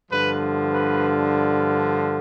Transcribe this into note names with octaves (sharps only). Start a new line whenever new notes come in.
G2 D3 F3 B4
B4